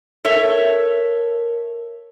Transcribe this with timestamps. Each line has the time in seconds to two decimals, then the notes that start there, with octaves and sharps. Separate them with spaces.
0.25 A4 A#4 C#5 E5